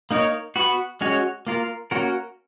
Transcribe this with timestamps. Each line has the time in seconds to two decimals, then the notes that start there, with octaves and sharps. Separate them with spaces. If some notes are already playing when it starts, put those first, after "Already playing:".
0.11 A#3 D#4 A#4 C#5
0.56 B3 F#4 B4
1.01 G#3 C#4 F#4 C#5
1.47 A#3 F4 A#4
1.91 A#3 C#4 F#4 A#4